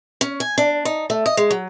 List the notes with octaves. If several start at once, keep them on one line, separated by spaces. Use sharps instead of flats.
C#4
G#5
D4
D#4
A3
D#5
G#3
F#3